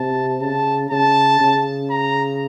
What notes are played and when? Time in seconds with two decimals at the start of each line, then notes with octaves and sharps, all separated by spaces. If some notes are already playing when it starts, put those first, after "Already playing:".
Already playing: C3 A5
0.41 C#3 A5
0.91 C#3 A5
1.41 C#3
1.90 A#5